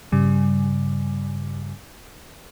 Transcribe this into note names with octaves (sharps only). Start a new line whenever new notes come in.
G2 C#3 G3